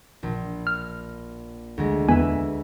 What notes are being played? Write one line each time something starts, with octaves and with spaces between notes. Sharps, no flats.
A#1
F6
D2 G#3
E2 B4 E5 G#5